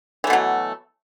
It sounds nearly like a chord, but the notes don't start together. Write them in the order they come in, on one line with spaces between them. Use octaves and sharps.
E3 A3 B2 F#3